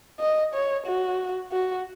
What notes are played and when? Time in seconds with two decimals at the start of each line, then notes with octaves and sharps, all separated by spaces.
0.21 D#5
0.54 C#5
0.86 F#4
1.52 F#4